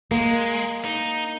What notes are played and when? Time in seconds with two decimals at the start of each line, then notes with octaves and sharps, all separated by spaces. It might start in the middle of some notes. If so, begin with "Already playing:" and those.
0.11 G#3 A#3
0.85 D#4